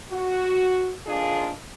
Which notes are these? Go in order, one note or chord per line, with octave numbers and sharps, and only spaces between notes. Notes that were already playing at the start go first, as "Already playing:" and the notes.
F#4
F2 A#2 D4 D#4 F4 G#4